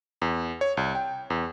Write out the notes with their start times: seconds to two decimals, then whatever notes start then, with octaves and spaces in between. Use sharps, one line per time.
0.22 E2
0.61 C#5
0.77 C2
0.95 G5
1.30 E2